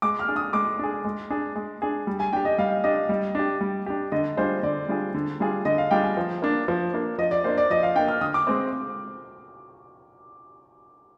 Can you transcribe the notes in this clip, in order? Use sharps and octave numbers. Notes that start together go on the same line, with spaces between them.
G#3 D6
F6
D4 G#4
D#6
G#3 D6
D4 G#4
G#3
D4 G#4
G#3
D4 G#4
G3
G#5
D4 G4 G5
D#5
G3 F5
D4 G4 D#5
G3
D4 G4
G3
D4 G4
D3 D#5
G3 D4 F4 G#4 C5
D3 D5
G3 D4 F4 G#4
D3
G3 D4 F4 G#4
D3 D#5
F5
G3 D4 F4 G#4 G5
G#5
F3
A#3 D4
F3
A#3 D4
F3 D#5
D5
A#3 D4 C5
D5
F3 D#5
F5
A#3 D4 G5
F6
D3 D#6
D6
G#3 C4